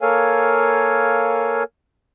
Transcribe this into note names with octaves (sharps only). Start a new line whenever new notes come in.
A#3 A4 A#4 C#5 F5 G#5